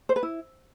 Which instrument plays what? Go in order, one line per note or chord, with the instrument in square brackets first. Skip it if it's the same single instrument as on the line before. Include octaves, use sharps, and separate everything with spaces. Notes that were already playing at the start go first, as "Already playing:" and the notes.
[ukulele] C5
B4
E4